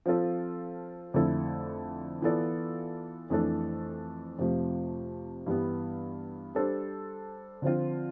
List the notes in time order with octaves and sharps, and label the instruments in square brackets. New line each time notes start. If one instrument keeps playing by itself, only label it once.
[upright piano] F3 C4 F4 A4
F2 D3 A3 E4 A4
E3 B3 F4 A4 D5
F2 E3 A3 D4 A4
F2 C3 F3 A3
G2 E3 G3 B3
G3 D4 A4 C5
D3 F3 C4 F4